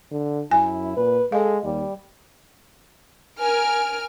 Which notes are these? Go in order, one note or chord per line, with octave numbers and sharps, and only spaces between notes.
D3
F#2 E4 G#5
A#2 B4
G#3 A4 F5
D#2 G3
A#4 G#5 F6 D7